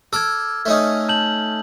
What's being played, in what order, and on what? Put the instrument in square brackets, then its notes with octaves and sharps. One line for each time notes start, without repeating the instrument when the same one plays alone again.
[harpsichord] A4 D6 [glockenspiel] E6 F6 G#6
[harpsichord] A3 C#4 D#4
[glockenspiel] A5 G6 F#7